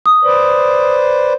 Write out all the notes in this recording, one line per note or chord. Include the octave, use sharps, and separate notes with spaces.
D#6
B4 C5 D5